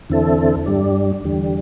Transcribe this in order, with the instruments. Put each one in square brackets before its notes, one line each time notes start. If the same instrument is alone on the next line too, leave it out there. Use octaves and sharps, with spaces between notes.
[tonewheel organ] E2 D3 C4 E4 A4
G2 G3 D4
E2 D3 G3